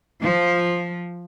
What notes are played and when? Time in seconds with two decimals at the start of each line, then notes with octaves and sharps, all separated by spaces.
0.23 F3